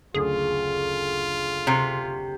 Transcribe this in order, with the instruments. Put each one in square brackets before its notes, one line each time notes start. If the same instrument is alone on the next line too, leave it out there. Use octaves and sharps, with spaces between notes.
[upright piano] F#1 D2 [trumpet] F4 [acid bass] G#4
[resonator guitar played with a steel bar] C3